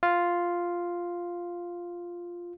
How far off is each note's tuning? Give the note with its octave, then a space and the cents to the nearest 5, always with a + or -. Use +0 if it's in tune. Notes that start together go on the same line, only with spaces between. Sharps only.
F4 +0 F5 +0